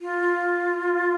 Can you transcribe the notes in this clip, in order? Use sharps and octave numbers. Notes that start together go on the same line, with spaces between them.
F4